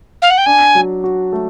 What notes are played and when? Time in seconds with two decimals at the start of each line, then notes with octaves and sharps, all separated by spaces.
0.22 F5
0.30 F#5
0.38 G5
0.46 D4 G#5
0.75 F#3
1.04 F#4
1.33 A3